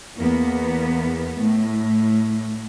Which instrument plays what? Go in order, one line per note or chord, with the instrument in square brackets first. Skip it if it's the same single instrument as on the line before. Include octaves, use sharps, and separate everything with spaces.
[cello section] E2 A#3 B3
A2